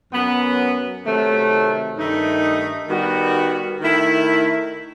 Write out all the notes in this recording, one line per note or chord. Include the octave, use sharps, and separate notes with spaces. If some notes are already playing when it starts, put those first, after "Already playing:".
F#2 F#3 B3
C3 D#3 F#3 A3
G2 D#3 A3 D#4
D#3 G3 B3 F#4
D#3 A3 E4